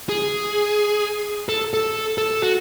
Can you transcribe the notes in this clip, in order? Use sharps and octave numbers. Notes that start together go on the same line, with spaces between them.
G#4
A4
A4
A4
F#4